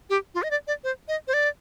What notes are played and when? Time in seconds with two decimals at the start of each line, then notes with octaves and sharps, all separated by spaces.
0.10 G4
0.35 F4
0.43 D#5
0.51 D5
0.67 D5
0.84 C5
1.08 D#5
1.28 C5
1.34 D5